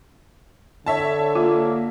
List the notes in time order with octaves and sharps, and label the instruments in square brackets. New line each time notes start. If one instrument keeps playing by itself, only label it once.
[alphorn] D3 [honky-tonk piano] C#5 E5 A5
[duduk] A#3 [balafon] F4